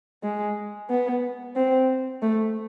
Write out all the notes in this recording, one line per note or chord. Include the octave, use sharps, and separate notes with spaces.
G#3
B3
C4
A3